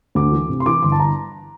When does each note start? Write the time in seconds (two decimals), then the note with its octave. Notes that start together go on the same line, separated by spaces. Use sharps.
0.15 D2 D6
0.32 E3
0.49 C3
0.60 C6
0.66 E3 D6
0.83 G1 C6
0.92 A5
1.00 A#5